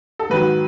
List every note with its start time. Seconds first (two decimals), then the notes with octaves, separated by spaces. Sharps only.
0.19 A4
0.30 G#2 D#3 F#3 B4